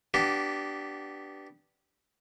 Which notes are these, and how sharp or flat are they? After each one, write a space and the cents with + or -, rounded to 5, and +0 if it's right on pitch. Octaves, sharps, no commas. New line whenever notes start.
B3 +0 D4 +0 G4 -20